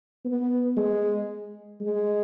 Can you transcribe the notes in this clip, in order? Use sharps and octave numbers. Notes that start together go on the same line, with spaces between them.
B3
G#3
G#3